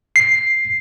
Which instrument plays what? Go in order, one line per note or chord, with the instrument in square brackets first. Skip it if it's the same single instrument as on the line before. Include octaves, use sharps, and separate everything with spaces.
[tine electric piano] C7